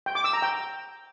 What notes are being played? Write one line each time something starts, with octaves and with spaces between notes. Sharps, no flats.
G5
D6
E6
A#5
G5